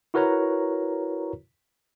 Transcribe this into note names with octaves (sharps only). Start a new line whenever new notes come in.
E4 F#4 A#4 B4 C#5 A#5